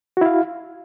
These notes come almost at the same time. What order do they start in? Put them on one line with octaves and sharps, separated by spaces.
F#4 E4 F5